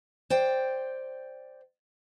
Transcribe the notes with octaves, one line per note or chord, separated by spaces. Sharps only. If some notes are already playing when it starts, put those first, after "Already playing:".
C5 D5 G5